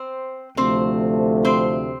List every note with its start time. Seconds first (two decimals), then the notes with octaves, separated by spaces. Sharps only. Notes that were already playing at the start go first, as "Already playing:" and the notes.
Already playing: C4 C5
0.57 D2 C3 F3 A3 C4 C5
1.45 C4 C5